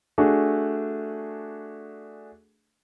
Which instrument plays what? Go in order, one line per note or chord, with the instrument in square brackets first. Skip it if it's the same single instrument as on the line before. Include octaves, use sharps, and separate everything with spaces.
[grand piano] A3 D4 F#4 G#4